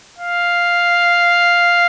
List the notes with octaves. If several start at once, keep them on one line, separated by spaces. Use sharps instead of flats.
F5